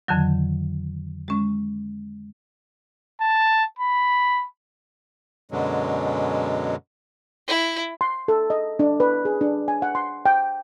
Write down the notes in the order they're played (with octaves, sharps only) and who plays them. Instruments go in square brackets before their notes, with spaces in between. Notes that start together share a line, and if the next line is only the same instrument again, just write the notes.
[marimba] F2 D3 D#3 F#3
G#3 C#4
[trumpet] A5
B5
[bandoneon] F#2 B2 D3 F#3 G#3
[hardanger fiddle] E4
[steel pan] C6
A4
D#5
D4
B4
G#4
D4
G#5
F#5
C6
G5